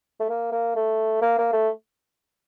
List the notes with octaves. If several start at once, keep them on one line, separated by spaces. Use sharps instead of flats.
A3
A#3
A#3
A3
A#3
A#3
A3